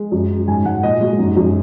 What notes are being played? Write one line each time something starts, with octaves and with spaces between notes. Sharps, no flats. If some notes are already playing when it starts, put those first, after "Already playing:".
Already playing: G#3
F#2
F#3
G#2 G#5
G#2 F#5
A#2 D#5
G#3 F#4
G#4
F#2 D#4
F#2